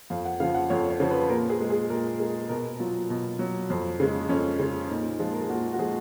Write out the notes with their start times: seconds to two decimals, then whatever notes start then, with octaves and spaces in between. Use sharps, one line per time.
0.10 F2 F5
0.25 F#5
0.40 C#3 F3 F5
0.54 F#5
0.70 F2 C#5
0.90 C#5
1.00 C#3 F3
1.10 B4
1.29 A#2 A#4
1.49 G#4
1.60 G#3
1.70 G#4
1.90 A#2 A#4
2.19 G#3 A#4
2.49 B2 A#4
2.80 F#3 F4
3.10 B2
3.39 F#3
3.70 F2
4.00 C#3 G#3
4.29 F2 C#4
4.60 C#3 G#3
4.89 A#2 D#4
5.20 F3 G#3 F4
5.33 A#4
5.41 G#4
5.50 A#2 F#4
5.73 F#4
5.79 F3 G#3 G#4